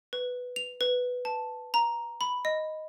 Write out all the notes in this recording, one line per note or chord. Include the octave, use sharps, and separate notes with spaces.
B4
F7
B4
A5
A#5
B5
D#5